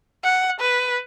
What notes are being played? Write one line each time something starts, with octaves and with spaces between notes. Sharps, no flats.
F#5
B4